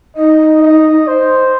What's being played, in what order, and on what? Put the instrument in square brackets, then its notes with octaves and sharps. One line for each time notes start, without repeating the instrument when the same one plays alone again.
[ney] D#4 [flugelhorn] D#5
[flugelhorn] D#5
C5